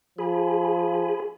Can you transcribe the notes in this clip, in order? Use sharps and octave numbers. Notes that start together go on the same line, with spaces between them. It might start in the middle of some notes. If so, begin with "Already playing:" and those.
F3 G#4 G#5 B5